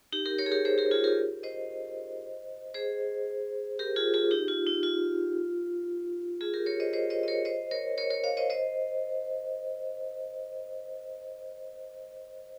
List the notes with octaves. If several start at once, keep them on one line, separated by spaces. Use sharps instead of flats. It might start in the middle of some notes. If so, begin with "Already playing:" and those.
D#4 G4
G4 A#4
A#4 C#5
G#4
G4 A#4
G#4 C5
G4 A#4
F4 G#4
G4 A#4
C5 D#5
G#4 C5
G4 A#4
F4 G#4
F4 G#4
D#4 G4
F4
D#4
F4
F4 G#4
G4 A#4
A#4 C#5
C5 D#5
C5 D#5
C5 D#5
D#5
A#4 C#5
C5 D#5
A#4 C#5
A#4 C#5
A#4 C#5
C#5 F5
C5 D#5
C5 D#5